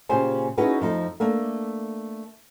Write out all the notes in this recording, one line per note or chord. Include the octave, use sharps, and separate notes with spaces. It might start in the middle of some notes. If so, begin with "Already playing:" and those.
A#2 C#3 G4 C5 G#5
C#4 D#4 E4 F#4 G#4 B4
F2 F3 A3 D#4
A3 A#3 D4